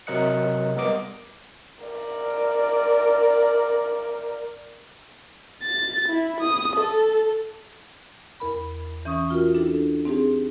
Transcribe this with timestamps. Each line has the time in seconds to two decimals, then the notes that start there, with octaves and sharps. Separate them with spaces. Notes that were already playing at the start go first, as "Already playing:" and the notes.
0.07 C3 F#3 A#4 D#5 F#6 C#7
0.76 G3 B3 A#4 D#5 D6
1.84 A#4 D5
5.63 A6
6.09 E4
6.41 D#6
6.76 A4
8.40 E2 A#4 B5
9.05 E3 C#4 C#6 D#6
9.30 F4 F#4 A#4
9.55 D4 E4 A4
10.05 C4 D#4 G4 G#4